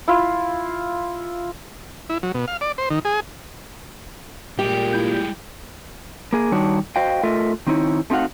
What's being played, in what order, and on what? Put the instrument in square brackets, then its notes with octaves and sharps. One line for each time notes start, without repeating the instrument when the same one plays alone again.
[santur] E4 F4
[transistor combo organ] E4
F#3
B2
F5
D5
C5
D#3
G#4
[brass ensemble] A#2 [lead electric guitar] G3 G#3 [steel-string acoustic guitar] G4
[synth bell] E4 G6
[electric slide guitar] A#3 G#4
D#3 G3 D4 D#4 F#4 C#5
F#4 C5 D#5 F5 G5
A3 F4 A4 A#4 D#5 E5
D#3 C4 D#4 E4 C#5
A3 C4 D#4 F#4 F5 F#5